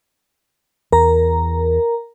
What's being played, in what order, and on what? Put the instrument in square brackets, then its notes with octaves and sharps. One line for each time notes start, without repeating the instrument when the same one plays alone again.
[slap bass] E2 [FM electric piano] A#4 A#5